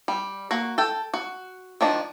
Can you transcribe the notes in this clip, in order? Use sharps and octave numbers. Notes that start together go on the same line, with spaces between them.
G3
A#3 F#4
A4 G5
F#4
D#3 F3 D4